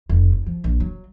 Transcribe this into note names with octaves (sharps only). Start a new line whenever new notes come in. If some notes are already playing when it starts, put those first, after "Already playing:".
F1
B1
F3
A#1
F#3